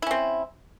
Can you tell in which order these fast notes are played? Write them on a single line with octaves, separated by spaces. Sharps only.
E4 C#4 C4